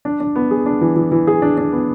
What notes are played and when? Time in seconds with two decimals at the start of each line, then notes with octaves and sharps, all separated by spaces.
0.05 D4
0.20 D4
0.36 B3
0.51 G#4
0.66 D4
0.81 E3
0.96 E3
1.12 E3
1.27 G#4
1.42 D4
1.58 D4
1.73 B3